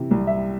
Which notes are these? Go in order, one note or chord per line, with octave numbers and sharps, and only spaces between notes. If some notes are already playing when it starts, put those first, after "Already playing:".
Already playing: C3 E3
C2
E5